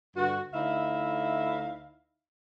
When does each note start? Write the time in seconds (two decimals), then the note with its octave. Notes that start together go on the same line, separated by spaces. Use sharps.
0.16 G2 D3 F#4
0.54 D2 D#4 E4 E5 F5